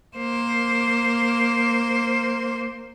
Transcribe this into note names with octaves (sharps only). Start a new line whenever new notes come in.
A#3 C5